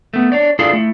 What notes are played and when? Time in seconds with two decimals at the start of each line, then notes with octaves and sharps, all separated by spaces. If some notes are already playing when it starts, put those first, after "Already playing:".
0.14 A3 B3
0.32 D4 C#5 D5
0.59 D4 E4 F4 G#4 A4
0.73 A3 E4